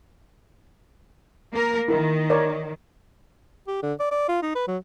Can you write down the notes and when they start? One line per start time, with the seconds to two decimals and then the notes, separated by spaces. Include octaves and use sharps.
1.52 A#3 A#4
1.88 D#3 E4 A#4
2.30 A#4 C#5 D5
3.67 G4
3.83 D3
4.00 D5
4.11 D5
4.29 F4
4.42 D#4
4.55 B4
4.68 F#3